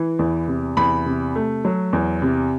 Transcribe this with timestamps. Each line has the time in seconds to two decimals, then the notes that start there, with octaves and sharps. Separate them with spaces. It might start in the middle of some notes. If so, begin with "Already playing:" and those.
Already playing: E3
0.19 E2
0.48 C3
0.77 E2 B5
1.06 C3
1.35 A3
1.65 F#3
1.93 E2
2.22 C3